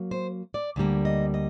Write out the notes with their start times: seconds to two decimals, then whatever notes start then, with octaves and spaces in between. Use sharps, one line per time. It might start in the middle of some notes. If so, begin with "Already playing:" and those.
Already playing: F#3 A#3
0.11 C5
0.54 D5
0.76 D2 D3 G3 A#3
1.05 D#5
1.34 D#5